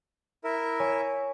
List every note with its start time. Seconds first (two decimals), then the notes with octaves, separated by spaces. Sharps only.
0.44 E4 A#4 E5
0.80 C#5 G#5